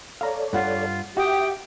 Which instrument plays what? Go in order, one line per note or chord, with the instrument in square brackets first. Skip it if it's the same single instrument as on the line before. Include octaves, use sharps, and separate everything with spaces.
[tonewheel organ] A4 C#5 D5 [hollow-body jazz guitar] F5 A#5
[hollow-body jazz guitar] G2 F#5 [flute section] F4
[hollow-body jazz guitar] F#4 [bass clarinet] G4 [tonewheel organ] E5 F#5 [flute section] G5 D#6